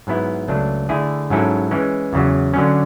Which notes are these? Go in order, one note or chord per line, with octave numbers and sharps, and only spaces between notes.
G#2 F#3 B3 E4
C#2 C#3 F#3 A3 D4
D3 A3 E4 G#4
G#2 F#3 C#4 E4 A4
E3 G#3 C#4
E2 C#3 F#3
D3 F#3 C#4